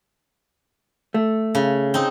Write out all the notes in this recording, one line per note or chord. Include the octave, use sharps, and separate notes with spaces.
A3
C#3
C4 D#4